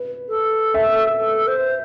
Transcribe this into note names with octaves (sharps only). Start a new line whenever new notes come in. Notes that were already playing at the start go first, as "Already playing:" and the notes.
Already playing: B4
A4
E5
A4
C5